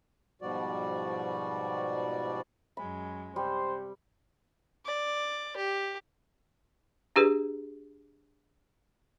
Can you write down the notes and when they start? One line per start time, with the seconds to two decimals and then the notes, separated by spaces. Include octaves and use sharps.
0.42 G#2 B2 F3 G3 F#4 D5
2.77 F#2 F#3 G#3 B5
3.36 C3 G3 C5
4.85 D5
5.56 G4
7.16 D4 G4 G#4 B4